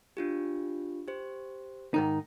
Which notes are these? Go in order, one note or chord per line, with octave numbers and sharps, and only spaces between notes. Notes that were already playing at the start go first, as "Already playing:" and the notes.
D4 F4 G4
G4 C5
G#2 D#3 D#4